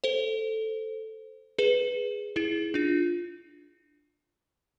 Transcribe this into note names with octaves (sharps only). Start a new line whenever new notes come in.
A4 C5
G#4 B4
E4 G#4
D4 F4